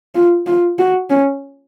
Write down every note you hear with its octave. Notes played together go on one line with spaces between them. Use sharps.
F4
F4
F#4
C#4